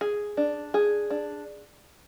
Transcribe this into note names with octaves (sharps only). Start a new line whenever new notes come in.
G#4
D4
G#4
D4